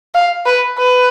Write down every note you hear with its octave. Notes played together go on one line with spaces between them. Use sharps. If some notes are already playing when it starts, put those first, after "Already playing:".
F5
B4
B4